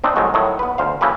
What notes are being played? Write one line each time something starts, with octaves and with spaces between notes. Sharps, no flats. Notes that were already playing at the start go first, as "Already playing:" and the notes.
C4 D4 D#4
C2 D#3 F#3 G#3 A3 F#4
A2 D#3 F#3
B3 B4
D2 C5 F5
C#3 E3 A#3 G4 A4 B4